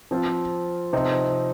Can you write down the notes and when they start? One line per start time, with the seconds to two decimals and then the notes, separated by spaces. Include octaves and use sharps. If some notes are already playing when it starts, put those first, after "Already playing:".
0.11 F3 C4 F4
0.93 C3 F3 C4 D#4